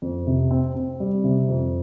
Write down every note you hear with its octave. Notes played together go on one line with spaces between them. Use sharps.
F2
C3
C4
C4
G3
C3
F2